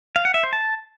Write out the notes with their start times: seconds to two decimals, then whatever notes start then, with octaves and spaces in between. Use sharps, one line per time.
0.16 F5
0.25 F#5
0.34 E5
0.43 C5
0.53 A5